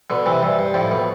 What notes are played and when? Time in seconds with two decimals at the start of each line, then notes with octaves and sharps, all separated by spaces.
0.10 B2 D3
0.26 C3 E3
0.43 G2
0.59 G2
0.74 F2 A2
0.91 B2